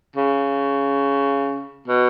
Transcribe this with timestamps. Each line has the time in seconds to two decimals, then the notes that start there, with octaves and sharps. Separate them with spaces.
0.16 C#3
1.88 B2